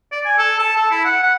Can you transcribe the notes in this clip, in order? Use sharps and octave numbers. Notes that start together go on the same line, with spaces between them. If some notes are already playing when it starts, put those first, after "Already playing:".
D5
G#5
A4
A5
A4
E4
F#5
F#5